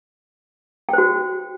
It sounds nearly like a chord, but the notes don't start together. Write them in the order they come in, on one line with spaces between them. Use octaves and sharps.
G5 C5 F#4